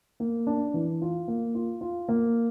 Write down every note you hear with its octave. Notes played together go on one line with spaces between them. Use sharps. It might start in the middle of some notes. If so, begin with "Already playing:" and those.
A#3
D4
E3
F4
A#3
F4
F4
A#3